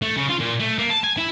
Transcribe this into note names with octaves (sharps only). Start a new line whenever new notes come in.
A3
C#3
F4
A#2
A3
A#3
A5
G#5
E4